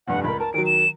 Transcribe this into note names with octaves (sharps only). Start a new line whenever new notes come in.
F1 G2 F#5
C#2 A#4 B5
A#4 A5
D#3 F#3 D7
E7